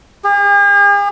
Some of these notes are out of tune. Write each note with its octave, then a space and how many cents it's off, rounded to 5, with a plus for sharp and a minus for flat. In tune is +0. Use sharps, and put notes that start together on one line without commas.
G#4 -45